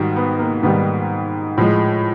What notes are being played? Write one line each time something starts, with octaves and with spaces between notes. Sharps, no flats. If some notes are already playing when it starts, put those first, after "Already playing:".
Already playing: G#2 D#3 G3 F#4
B3
A#3
G#2 D#3 G3 B3
A2 F3 G#3